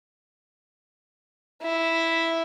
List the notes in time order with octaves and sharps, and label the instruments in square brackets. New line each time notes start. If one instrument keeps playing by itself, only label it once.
[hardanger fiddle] E4